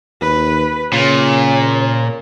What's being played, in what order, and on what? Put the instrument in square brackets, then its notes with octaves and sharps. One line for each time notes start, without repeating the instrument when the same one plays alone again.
[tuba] D#2 [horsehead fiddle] B4
[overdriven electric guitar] A#2 [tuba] C#3 [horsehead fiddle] C#5